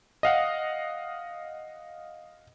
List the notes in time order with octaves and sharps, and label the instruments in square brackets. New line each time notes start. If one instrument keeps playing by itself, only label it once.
[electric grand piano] D#5 F5 F#5